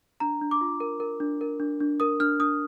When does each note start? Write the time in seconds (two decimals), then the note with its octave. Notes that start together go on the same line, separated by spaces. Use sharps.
0.20 D4 A#5
0.41 D4
0.51 D6
0.61 F4
0.80 A#4
1.00 A#4
1.20 D4
1.41 A#4
1.60 D4
1.80 D4
2.00 A#4 D#6
2.20 D4 F6
2.39 D4 D#6